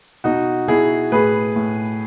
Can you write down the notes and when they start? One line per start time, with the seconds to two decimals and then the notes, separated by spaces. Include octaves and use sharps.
0.24 B2 D#4 F#4
0.68 B2 E4 G#4
1.12 A2 G#4 B4
1.56 A2